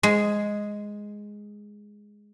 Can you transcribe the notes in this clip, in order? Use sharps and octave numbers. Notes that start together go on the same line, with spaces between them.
G#3 G#4